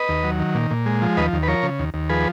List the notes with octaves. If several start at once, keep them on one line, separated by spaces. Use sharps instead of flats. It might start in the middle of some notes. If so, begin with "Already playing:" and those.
Already playing: B4 D#5
D#2
F#3
D#3
A#2
A#2
G#3
F3
D#2 B4 D#5
D#2
B4
F3 A#4 C#5
C#3
D#2
D#2
F3 G#4 B4